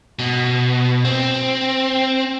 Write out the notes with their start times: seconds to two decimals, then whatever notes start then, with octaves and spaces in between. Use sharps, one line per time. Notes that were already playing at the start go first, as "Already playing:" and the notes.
0.19 B2
1.05 C4